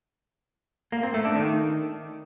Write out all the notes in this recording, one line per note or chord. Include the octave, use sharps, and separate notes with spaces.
A#3
C4
A3
D4
D#3